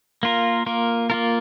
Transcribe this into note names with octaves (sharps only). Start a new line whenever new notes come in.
A#3 F4 A#4
A#3 F4 A#4
A#3 F4 A#4